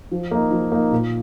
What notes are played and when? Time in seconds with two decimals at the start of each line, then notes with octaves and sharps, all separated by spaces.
0.12 F3
0.31 A#3 D#4
0.51 F3
0.72 A#3 D#4
0.92 A#2